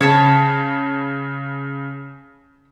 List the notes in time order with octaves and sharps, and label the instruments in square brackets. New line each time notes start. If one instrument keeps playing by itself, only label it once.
[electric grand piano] C#3 [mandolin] C#5 A5 B5